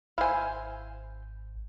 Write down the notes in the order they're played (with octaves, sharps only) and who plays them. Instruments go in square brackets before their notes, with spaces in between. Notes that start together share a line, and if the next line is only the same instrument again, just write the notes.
[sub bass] G#1 [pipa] E4 C5 [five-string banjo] F5 G#5